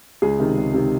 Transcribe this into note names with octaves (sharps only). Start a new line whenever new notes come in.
C#2 G#4
C3 D#3
C#2
C3 D#3